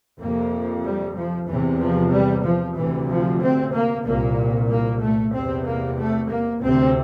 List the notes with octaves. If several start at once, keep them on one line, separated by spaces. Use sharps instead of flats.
F2 C3 A#3
G3
F3
E2 C3 E3
F3
G3
F3
D2 C3 E3
F3
C4
A#3
C2 A#2 A#3
A#3
A3
E2 C3 C4
A#3
A3
A#3
D2 C3 C4